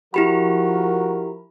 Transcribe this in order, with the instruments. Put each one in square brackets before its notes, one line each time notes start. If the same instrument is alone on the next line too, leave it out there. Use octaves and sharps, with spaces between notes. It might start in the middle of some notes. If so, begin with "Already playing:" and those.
[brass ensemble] F3 A#4 [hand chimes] E4 G4 B5 [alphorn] F#4